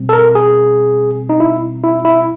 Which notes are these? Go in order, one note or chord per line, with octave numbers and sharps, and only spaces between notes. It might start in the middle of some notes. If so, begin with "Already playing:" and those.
Already playing: B2 G3 C4
A4
A#4
G#4
D#4
E4
E4
E4